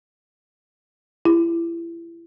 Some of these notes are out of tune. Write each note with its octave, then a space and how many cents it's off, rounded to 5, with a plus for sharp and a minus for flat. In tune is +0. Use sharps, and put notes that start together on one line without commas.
E4 +30 G4 +45